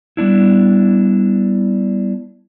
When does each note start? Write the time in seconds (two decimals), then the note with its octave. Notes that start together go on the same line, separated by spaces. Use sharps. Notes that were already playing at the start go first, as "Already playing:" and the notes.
0.17 G3 B3 D4 E4